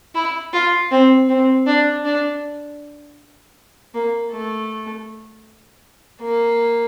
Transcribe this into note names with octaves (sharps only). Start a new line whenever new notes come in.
E4
F4
C4
C4
D4
D4
A#3
A3
A#3